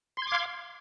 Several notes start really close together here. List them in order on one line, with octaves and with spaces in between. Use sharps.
C6 G#6 D6 F5